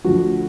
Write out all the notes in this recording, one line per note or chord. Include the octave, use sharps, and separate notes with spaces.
D2 D3 F3 F#4